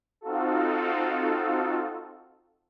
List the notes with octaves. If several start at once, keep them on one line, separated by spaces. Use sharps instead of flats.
C4 D#4 F4 F#4 A4